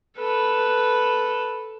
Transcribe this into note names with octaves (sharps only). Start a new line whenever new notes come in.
A4 B4